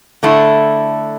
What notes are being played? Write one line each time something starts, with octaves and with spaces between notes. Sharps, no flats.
D3 A3 E4